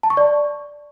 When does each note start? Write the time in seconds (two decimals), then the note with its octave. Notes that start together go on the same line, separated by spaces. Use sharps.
0.03 A5
0.10 C#6
0.17 D5